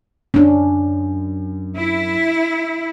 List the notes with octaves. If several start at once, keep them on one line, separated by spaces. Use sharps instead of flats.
F#2 C#4 D4
E4